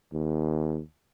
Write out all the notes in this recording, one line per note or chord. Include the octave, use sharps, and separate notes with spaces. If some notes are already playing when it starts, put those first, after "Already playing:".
D#2